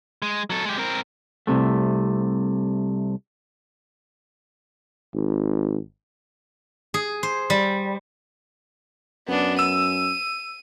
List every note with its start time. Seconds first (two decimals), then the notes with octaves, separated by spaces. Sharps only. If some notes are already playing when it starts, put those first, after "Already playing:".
0.22 G#3
0.50 F#3 A4
0.65 G#3 G4
0.78 C4 A#4
1.47 C2 G2 C3 A3
5.14 G#1
6.94 G#4
7.23 C5
7.50 G3
9.28 F#2 B3 D4
9.59 E6 D#7